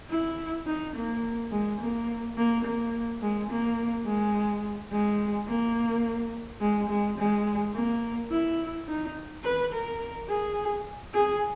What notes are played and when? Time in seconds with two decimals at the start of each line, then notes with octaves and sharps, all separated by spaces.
0.10 E4
0.67 D#4
0.96 A#3
1.52 G#3
1.81 A#3
2.37 A#3
2.65 A#3
3.22 G#3
3.50 A#3
4.07 G#3
4.92 G#3
5.48 A#3
6.61 G#3
6.90 G#3
7.18 G#3
7.75 A#3
8.31 E4
8.88 D#4
9.44 B4
9.73 A#4
10.29 G#4
11.14 G#4